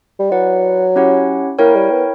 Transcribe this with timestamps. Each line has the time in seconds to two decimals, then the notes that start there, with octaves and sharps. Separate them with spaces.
0.20 G3
0.31 F#3 E4 B4 D5 F#5
0.96 C#4 E4 G4 C#5 F#5
1.59 A#3 E4 A#4 C#5 G5
1.75 G3
1.91 B3